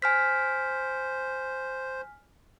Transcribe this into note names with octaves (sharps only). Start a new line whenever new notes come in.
C5 G#5 F6 B6